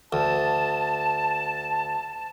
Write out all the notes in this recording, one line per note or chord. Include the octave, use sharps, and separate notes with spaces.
D2 A5